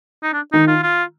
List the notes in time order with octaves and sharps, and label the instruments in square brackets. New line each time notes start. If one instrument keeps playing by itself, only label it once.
[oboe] D#4
D4
[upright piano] D#3 [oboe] D#4
[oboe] F4
F4